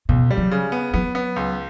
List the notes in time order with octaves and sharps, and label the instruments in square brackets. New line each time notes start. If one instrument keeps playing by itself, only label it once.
[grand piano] C#2 [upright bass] B2
[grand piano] G3
[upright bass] F#3
[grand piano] C#3
B3
[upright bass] F#3 [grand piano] B3
[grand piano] B3
C#2